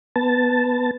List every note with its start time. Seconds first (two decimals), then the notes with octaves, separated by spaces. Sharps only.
0.16 B3 A5